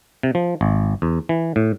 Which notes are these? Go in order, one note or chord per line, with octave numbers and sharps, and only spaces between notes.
C3
F3
G#1
E2
E3
A2